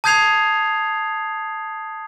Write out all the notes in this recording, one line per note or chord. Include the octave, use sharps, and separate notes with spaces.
A5 D#6 G6 G#6 C7 F7